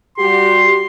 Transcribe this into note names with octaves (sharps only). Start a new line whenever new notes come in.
G3 F#4 G4 C6